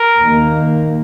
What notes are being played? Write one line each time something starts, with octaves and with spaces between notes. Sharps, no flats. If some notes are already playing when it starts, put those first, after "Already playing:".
Already playing: A#4
D#2 D#3 A#3